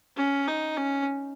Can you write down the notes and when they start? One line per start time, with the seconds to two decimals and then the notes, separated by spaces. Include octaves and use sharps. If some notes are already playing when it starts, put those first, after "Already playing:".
0.17 C#4
0.48 D#4
0.77 C#4